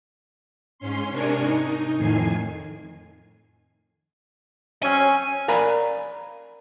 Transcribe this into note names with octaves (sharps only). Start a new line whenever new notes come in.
G#2 C#4 C6
C3 D4 A#4 G#5 C#6
D#4
F2 A2 D#3 G#5 C7
F#3 C4 C#4 G#5
A#4 D5 F5 G#5 A#5 B5